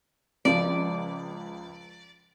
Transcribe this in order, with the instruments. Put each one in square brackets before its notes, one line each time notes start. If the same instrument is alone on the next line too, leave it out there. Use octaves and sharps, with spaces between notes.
[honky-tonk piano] C#2 F3 [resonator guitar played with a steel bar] D5